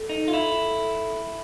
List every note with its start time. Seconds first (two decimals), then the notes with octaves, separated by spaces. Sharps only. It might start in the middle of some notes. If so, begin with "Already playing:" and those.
Already playing: A4
0.09 D#4
0.28 F4
0.33 E4